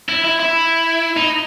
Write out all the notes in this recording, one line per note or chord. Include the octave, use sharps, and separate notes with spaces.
E4
E4
E4
D#4